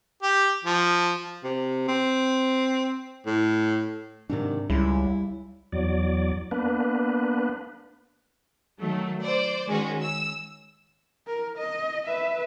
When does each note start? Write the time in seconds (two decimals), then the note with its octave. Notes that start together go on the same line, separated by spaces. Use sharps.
0.22 G4
0.64 F3
1.43 C3
1.88 C4
3.26 A2
4.30 G#2 C3 D#3 D4
4.70 C#2 G3 E4
5.72 E2 F#3 D5
6.51 A#3 B3 D4 B4
8.79 D#3 F#3 A3
9.22 C5 D5
9.67 D#3 G#3 C#4 F#4
10.00 E6
11.27 A#4
11.58 D#5
12.07 B4 E5